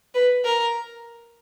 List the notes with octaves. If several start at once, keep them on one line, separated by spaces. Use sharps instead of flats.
B4
A#4